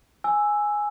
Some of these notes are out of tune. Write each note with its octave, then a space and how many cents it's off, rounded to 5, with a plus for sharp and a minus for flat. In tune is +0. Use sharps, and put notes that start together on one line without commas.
G#5 +0 E6 +0